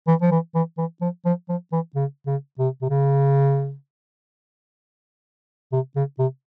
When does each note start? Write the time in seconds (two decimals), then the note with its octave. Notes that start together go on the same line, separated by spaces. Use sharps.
0.07 E3
0.22 F3
0.31 E3
0.55 E3
0.78 E3
1.01 F3
1.25 F3
1.49 F3
1.72 E3
1.95 C#3
2.27 C#3
2.59 C3
2.82 C3
2.90 C#3
5.73 C3
5.96 C#3
6.19 C3